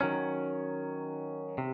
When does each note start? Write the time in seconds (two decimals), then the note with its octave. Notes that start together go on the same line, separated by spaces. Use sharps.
0.01 D#3 F#3 C#4
1.58 C3